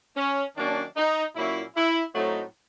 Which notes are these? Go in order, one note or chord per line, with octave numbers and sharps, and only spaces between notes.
C#4
D#3 F#3 A#3 C#4 D4
D#4
A#2 F#3 A#3 C#4 E4
E4
A2 F#3 A3 C4 D#4